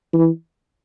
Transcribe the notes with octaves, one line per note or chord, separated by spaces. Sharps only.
E3